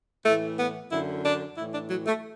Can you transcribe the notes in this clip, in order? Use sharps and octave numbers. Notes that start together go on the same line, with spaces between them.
A2 E3 A3
B3
F#2 D3 E4
D4
A2 E3 E4
D4
F#3
A3